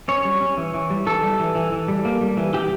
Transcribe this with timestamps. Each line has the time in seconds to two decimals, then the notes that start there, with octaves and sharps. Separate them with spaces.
0.08 C#4 C#5
0.25 G3
0.41 C#4
0.57 E3
0.74 E3
0.90 G3
1.07 E3 A4
1.23 G3
1.39 E3
1.55 E3
1.72 E3
1.88 G3
2.05 A#3
2.21 G3
2.37 E3
2.54 E3 G4